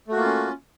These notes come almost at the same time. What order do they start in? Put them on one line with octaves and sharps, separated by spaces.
A3 F#4 A#3 F4 C#4